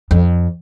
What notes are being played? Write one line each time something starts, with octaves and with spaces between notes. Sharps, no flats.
F2